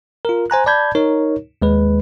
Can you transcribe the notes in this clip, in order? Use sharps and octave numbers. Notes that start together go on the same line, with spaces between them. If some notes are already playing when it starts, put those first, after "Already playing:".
F4 A#4
C5 G#5 A#5 F#6
D5 A5 B5 G6 G#6
D#4 A#4 C#5
D#2 G#3 B4